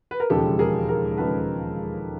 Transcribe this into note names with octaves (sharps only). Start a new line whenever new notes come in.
B4
A#4
E1 D#2 C#3 F3 G#3 G4 A4
G#4 A#4
G#4 A#4
E1 D#2 C#3 F3 G#3 A4 B4